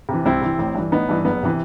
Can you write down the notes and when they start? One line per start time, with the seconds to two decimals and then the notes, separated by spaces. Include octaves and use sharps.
0.09 C3 E3
0.25 C2 C4 E4
0.42 C3 E3
0.59 A1
0.75 G2 E3
0.92 A1 B3 D#4
1.09 G2 E3
1.25 F#1 B3
1.43 C3 E3